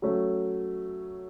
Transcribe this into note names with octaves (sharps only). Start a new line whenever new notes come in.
F#3 A3 C#4